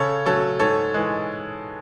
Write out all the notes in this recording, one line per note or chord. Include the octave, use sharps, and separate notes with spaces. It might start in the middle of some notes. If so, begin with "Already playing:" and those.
Already playing: C#3 A4 C#5
F#3 A3 C#4 A4 C#5
G#2 A4 C#5
E3 G#3